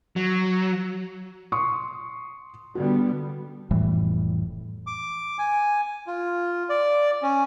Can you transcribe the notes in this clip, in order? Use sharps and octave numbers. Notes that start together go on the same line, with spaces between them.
F#3
C6 C#6 D#6
D3 G3 B3 F#4
F1 A2 E3 G3
D6
G#5
F4
D5
C#4